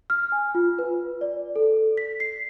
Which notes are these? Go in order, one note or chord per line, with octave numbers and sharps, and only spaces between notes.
F6
G#5
F4
B4
D5
A4
B6
C7